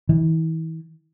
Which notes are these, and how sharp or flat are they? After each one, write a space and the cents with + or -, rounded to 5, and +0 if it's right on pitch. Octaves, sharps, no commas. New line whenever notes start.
E3 -35